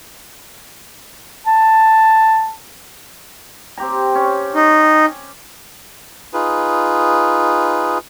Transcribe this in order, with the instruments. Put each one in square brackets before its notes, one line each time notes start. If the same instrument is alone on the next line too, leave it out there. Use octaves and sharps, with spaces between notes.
[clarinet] A5
[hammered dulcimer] C4 G4 A#5
C#4
[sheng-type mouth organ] D#4
[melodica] D#4 F4 G#4 B4